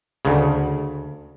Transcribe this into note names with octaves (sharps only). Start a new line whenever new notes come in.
D2 C#3